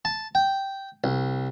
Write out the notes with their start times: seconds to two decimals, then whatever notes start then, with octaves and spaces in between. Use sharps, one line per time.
0.05 A5
0.35 G5
1.04 C2